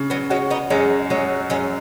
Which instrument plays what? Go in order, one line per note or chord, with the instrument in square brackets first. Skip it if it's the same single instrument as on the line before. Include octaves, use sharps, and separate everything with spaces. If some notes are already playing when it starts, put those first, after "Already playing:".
Already playing: [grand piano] C#3
[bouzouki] F#3 B3
[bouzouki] G#3 C#4 [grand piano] F#4
[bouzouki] B3 D#4
[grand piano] F#2 [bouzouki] G#3 C#4
[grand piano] F#3 [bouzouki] G#3 C#4
[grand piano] F#2 [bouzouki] G#3 C#4